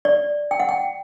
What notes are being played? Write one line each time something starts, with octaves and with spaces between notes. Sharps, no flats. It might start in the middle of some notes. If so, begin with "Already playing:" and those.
D5
G5
F#5
G5